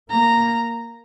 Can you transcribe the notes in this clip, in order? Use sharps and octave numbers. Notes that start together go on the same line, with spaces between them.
A#3 A#5